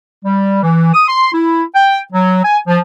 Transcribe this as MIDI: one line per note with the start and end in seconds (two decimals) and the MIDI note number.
0.24 0.63 55
0.63 0.93 52
0.94 1.05 87
1.08 1.30 84
1.33 1.63 64
1.75 1.99 79
2.12 2.43 54
2.43 2.58 80
2.67 2.79 53